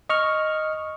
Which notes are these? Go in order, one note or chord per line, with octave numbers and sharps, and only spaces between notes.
D#5 C#6 F6